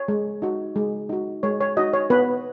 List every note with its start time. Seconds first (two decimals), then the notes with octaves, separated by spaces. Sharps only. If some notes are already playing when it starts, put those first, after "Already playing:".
Already playing: C#5
0.08 G#3
0.42 D#4 F#4
0.76 G#3
1.09 D#4 F#4
1.43 G#3 C#5
1.61 C#5
1.77 D#4 F#4 D#5
1.93 C#5
2.10 B3 B4